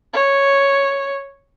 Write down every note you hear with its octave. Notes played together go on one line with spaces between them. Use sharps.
C#5